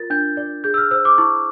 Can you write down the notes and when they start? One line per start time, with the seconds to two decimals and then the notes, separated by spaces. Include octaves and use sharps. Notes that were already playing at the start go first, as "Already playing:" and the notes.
Already playing: F4 A#4 A6
0.10 D4 G6
0.37 D5
0.64 G#4 G6
0.74 E6
0.78 F6
0.91 C5 E6
1.05 D6
1.18 E4 C#6